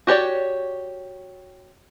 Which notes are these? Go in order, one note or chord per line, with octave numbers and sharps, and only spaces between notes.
F#4 G4 C#5 D5